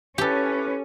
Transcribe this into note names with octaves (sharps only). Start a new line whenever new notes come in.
C#4 E4 G4 A4 B4 D6